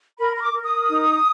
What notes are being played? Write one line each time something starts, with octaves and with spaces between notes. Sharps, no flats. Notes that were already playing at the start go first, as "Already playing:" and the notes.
A#4 B5
B5
D6
A#4
D#6
D#4